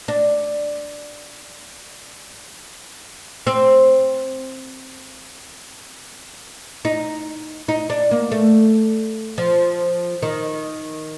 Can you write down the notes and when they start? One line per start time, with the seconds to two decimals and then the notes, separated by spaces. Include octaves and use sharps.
0.08 D4
3.47 C4
6.85 D#4
7.68 D#4
7.90 D4
8.11 A#3
8.32 A3
9.38 F3
10.22 D#3